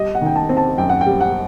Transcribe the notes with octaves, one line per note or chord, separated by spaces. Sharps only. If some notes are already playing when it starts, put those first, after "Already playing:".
Already playing: G3 D#5
F#5
D#3 G5
A5
C4
A5
F#2 G5
F#5
G5
G3
F#5